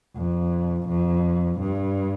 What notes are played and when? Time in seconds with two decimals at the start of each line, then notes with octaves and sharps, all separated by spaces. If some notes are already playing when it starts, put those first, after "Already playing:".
0.16 F2
0.89 F2
1.60 G2